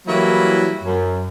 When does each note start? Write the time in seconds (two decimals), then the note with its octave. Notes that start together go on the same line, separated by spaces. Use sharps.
0.06 E3 F#3 G3 A#3 E4
0.82 F#2